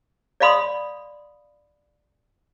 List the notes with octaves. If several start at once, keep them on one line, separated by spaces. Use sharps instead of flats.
D5 D#5 F5 B5 C6 D#6